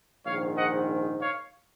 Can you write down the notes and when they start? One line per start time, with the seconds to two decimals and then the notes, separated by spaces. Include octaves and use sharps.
0.25 A#1 G#2 D#3 C#5 F5
0.57 D#5 F#5
1.20 C#5 F5